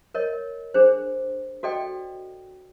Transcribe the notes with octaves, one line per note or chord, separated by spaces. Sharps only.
A#4 C#5 D#5
D4 G#4 C5
F#4 A4 D5 D#5 G5